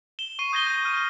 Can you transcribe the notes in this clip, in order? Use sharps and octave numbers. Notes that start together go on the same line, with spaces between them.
E7 G7
C#6 C7 D#7
D#6 G6 G#6 A#6 D#7 G7
G6 A#6
F6 D#7